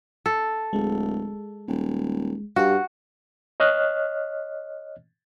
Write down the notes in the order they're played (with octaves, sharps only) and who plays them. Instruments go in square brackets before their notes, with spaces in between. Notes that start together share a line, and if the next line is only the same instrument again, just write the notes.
[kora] A4
[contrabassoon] D1 [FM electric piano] G#3
[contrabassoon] D#1
[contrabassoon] G2 [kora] F#4 [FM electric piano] G4 F5
[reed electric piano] C#5 D#5 F6 F#6